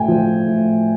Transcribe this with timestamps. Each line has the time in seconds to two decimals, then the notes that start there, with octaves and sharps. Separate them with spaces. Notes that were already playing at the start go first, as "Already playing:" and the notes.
Already playing: A2 A3 G5 G#5
0.08 F3
0.47 A2